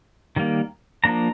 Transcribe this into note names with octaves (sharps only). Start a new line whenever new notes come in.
D#3 G3 A#3
F3 A#3 D4 A#5